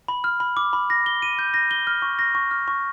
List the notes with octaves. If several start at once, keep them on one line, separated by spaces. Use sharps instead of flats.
B5
F6
B5
D6
B5
A#6
G7
D#7
G6
A#6
G7
F6
C#6
A#6
C#6
F6
C#6